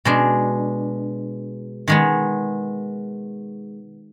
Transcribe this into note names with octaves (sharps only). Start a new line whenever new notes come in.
B2 G#3 D4
D#3 G#3 B3